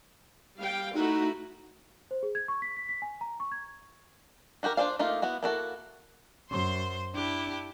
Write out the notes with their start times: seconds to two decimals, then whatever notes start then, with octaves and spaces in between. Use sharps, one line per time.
0.58 G3 F5 G5
0.94 A3 D#4 E4 F#4
2.11 C5
2.23 G#4
2.35 G#6
2.48 C#6
2.62 B6
2.77 B6
2.89 B6
3.02 G#5
3.21 A#5
3.40 C#6
3.52 G#6
4.63 D#4 F#4 G4 A#4
4.77 D4 F4 C5 D5 F5
4.99 A3 A#3 D#4 F4
5.22 B3 E4 F#4
5.43 A#3 E4 F#4 A4
6.50 F#2 C5 C6
7.15 D4 E4 G4